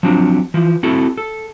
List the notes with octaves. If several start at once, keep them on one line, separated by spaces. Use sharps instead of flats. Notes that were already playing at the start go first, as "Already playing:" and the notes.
F3 F#3 C4 D4
E3 F3
C4 E4 F#4 A4
A4